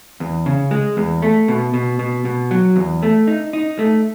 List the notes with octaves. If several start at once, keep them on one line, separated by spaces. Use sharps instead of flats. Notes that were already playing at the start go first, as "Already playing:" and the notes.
E2
C#3
G#3
E2
A3
B2
B2
B2
B2
F#3
E2
A3
D#4
D#4
A3